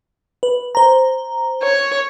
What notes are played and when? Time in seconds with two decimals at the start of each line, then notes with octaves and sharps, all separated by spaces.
0.43 B4
0.75 C5 A#5
1.63 C#5